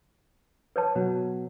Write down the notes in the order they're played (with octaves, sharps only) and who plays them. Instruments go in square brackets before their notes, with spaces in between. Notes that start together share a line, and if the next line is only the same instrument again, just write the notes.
[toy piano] B4 C#5 A5
[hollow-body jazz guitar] B2 F#3